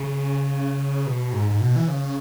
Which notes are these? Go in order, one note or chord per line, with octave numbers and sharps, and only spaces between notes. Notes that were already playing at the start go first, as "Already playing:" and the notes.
Already playing: C#3
B2
G#2
G#2
B2
E3
C#3